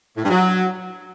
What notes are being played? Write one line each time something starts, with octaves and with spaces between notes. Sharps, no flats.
A2
G2
F#3